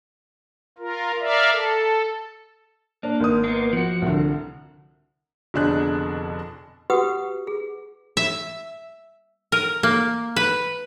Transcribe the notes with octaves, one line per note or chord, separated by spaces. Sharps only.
F4 A#4
A#4 D5 E5 F5
A4
A#3 D4
G#1 D#6
A#3 B3
F3 F#4
C2 D3
F1 B2 D3 D4 G#4 F#6
F#4 G4 B4 F#5 D#6
G#4
E5
A#4
A#3
B4